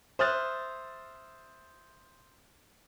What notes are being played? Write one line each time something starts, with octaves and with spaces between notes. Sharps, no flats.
C5 E5 D#6 F6 F#6 A6